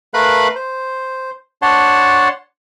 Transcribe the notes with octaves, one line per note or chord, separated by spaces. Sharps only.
A3 A#4 B4 F5 B5 F#6
C5
D4 C#5 F#5 A5 C6